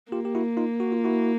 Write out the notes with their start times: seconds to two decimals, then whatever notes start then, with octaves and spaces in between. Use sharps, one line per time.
0.12 A#3 F4 G4
0.25 G4
0.35 E4 F#4
0.57 D#4 F4
0.80 F#4
0.92 F4
1.05 E4 F#4